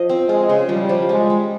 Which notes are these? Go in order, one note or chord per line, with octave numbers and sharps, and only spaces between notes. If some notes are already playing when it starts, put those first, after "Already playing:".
Already playing: F3 D#5
C4
G#3 F4
C#3
F3 G3
F3
G3 G#3
G3